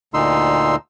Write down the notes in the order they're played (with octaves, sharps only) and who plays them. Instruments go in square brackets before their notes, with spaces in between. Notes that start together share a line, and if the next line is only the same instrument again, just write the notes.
[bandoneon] D2 A#2 D3 D#4 C6 E6